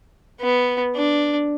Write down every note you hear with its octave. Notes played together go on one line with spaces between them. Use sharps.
B3
D4